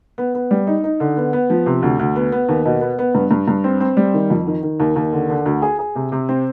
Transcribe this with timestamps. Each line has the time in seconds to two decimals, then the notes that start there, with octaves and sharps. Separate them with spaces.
0.18 B3
0.35 B3
0.51 G3
0.67 D#4
0.84 D#4
1.00 D3
1.17 B3
1.33 B3
1.50 F3
1.66 C3
1.82 D2
1.99 D2
2.16 B3
2.32 B3
2.49 D#2
2.65 B2
2.81 B3
2.99 B3
3.15 G2
3.31 G2
3.48 G2
3.64 C4
3.80 C4
3.97 G3
4.14 D#3
4.30 F2
4.47 D#3
4.63 D#3
4.80 D#2
4.96 D#2
5.13 D3
5.30 D3
5.46 D2
5.62 G#4
5.79 G#4
5.95 C3
6.12 C3
6.29 C4